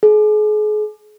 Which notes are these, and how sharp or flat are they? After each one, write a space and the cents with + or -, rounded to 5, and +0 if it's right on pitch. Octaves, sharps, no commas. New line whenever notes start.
G#4 +35